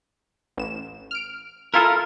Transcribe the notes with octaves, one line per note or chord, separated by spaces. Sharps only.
A1 E7
F6 D7
E4 F4 A4 A#4